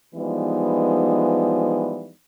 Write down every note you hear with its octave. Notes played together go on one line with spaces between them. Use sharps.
E3 F3 G3 G#3 B3 D#4